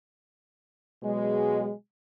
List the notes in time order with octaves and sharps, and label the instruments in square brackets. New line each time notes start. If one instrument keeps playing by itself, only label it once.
[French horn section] B2 F#3 G#3